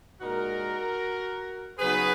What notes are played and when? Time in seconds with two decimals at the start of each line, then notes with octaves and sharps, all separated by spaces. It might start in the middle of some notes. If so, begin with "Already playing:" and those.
0.21 A#2 G#3 D#4 F#4 A#4
1.79 C#3 F#3 B3 D#4 G#4 B4